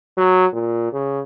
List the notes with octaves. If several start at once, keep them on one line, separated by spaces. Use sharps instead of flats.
F#3
A#2
C#3